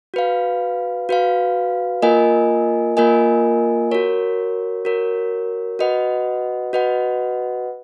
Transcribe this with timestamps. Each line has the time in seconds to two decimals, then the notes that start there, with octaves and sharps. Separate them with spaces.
0.14 F#4 B4 F5
1.09 F#4 B4 F5
2.02 A#3 F4 A#4 D#5 G#5
2.97 A#3 F4 A#4 D#5 G#5
3.91 F#4 A#4 C#5
4.85 F#4 A#4 C#5
5.79 F#4 B4 D#5 F#5
6.73 F#4 B4 D#5 F#5